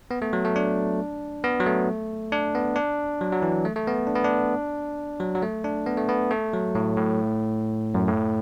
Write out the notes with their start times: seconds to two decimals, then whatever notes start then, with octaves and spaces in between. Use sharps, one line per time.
0.11 B3
0.22 A3
0.33 F#3
0.45 A3
0.56 D4
1.44 B3
1.60 F#3
1.66 A3
2.32 D4
2.55 B3
2.76 D4
3.21 F#3
3.32 F#3
3.42 E3
3.65 A3
3.76 A3
3.88 B3
4.07 D4
4.15 B3
4.24 D4
5.20 F#3
5.35 F#3
5.42 A3
5.64 D4
5.86 B3
5.97 A3
6.09 B3
6.31 A3
6.53 F#3
6.75 A2
6.97 A2
7.94 F#2
8.08 A2